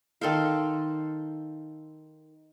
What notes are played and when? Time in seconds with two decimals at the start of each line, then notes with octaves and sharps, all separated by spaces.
0.21 D#3 A4 C5 F5